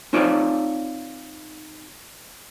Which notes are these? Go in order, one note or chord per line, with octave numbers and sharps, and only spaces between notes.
C4 D#4 F4 C#5 D5